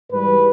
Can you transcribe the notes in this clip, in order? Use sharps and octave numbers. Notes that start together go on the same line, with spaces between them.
G#2 E3 G3 B4